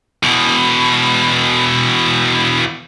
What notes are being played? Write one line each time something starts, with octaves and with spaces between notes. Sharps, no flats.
E2 B2